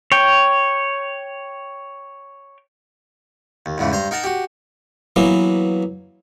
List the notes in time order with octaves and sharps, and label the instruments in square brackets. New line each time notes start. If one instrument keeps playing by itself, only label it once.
[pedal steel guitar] C#5 G5
[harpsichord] D#2
E2 G#2 C#3 E3
G2 C5 A#5
D#4 A#4 F#5 A5 A#5
F#4 G4
E3 F#3 A#3 B3